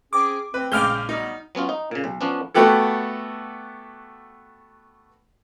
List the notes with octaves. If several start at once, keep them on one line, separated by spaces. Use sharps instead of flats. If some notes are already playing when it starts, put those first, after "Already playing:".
C4 C#4 G#4 D6
C4 B4
A#1 C#3 G#3 D6 F6 G6
F#3 G3 B3 D#4
F#3 B3 C#4 F4
D#4
A#2 C#3
B1
F3 B3 C#4 D4
A3 B3 F#4 G4 A4